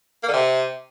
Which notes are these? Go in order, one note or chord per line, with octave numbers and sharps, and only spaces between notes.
A#3
D3
C3